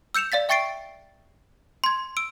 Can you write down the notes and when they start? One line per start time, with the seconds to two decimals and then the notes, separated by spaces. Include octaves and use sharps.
0.15 E6 G6 C#7 E7 F7
0.32 D5 F5 A6 B6
0.49 E5 G5 C#6 A6 C7 D7
1.84 C6 G#6
2.17 E6 D7